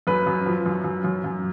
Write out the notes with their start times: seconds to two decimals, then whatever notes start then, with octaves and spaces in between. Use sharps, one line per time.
0.07 F#2 B4
0.27 F#2
0.46 F3
0.66 F#2
0.84 F#2
1.04 F#2
1.24 F#2